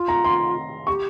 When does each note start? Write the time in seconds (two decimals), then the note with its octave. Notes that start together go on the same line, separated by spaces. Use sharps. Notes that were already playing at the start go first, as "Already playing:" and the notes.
Already playing: F4
0.08 A#5
0.24 C6
0.87 G4 C#6